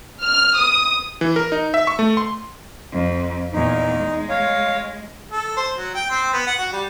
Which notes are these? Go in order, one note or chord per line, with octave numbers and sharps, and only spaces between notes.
F6
D#6
E3
A#4
D#4
E5
C#6
A3
C6
F2
E2 A#2 D#4
G#3
C#5 F5
A4
C5
F#3
G5
C4
B3
F#5
F#4
G3